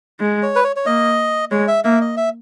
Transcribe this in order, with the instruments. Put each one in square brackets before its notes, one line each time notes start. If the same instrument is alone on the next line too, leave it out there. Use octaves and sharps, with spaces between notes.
[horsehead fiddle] G#3
[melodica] C#5
B4
C#5
C#5
[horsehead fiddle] A#3 [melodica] D#5
[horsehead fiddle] G#3 [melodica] C#5
[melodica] E5
[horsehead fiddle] A#3 [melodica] E5
[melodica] D#5
E5